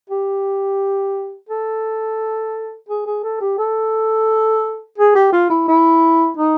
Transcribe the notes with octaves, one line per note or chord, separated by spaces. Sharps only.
G4
A4
G#4
G#4
A4
G4
A4
G#4
G4
F4
E4
E4
D#4